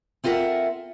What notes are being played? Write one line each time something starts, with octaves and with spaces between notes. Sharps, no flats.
C4 F4 A4 A#4 E5 F#5